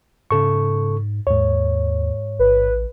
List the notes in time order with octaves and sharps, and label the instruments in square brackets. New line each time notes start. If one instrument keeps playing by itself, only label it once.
[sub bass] G#2 [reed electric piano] C#3 A4 C#6
[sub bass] D#2 [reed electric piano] G#2 C#5
[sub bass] A1 [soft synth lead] B4